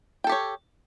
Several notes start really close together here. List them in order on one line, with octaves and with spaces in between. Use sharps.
G5 A4 G4 C#5